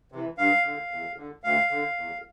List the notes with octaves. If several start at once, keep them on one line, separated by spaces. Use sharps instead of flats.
C3 E3
G2 F5
D3
E2
D3
D2 F5
D3
E2